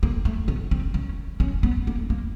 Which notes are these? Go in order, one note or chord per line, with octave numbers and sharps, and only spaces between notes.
A#3
A3
B3
C4
C#4
C#4
B3
A#3
A#3